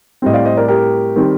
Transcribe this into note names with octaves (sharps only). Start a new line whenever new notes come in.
A2 G3 C4 D#5
D5 F5
C5 D#5
A#4 D5
G4 A#4
D#3 G3 C4